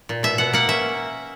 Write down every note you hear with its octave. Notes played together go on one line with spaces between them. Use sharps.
A#2
B2 E5
B2 F#5
A#3 F#5
C#4 E5